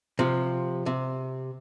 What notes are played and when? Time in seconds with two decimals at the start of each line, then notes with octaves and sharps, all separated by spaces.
0.19 C3 F3
0.86 C3